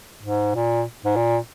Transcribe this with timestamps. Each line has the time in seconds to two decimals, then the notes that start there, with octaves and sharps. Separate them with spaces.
0.23 G#2
0.55 A#2
1.04 G#2
1.16 A#2